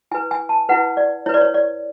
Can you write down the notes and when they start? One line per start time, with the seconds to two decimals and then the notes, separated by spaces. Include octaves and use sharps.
0.11 E4 B4 G#5
0.31 G#5
0.49 A5
0.69 E4 B4 F#5
0.97 D5
1.26 E4 C#5
1.29 B4
1.34 D5
1.41 C#5
1.54 D5